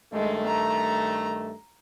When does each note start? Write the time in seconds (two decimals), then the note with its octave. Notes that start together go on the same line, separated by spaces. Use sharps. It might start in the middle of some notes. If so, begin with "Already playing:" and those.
0.13 G2 D#3 G#3 A3
0.47 A#5